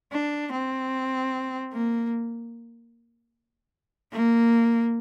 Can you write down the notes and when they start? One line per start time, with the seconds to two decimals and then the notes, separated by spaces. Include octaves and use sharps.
0.13 D4
0.52 C4
1.73 A#3
4.12 A#3